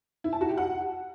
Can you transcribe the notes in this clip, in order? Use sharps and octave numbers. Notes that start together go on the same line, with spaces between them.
E4
A5
F#4
G4
F#5